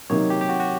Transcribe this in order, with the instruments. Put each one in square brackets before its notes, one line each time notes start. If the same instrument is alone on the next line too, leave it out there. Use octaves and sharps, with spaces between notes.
[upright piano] C3 D#3 F#3 A#3 D#4 [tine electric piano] C#5
[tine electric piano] G4
G4
F#4
F#4